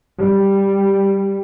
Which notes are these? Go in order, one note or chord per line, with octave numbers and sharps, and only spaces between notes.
G3